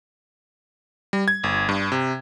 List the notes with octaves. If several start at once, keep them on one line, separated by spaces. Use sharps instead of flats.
G3
G#6
G1
G2
C3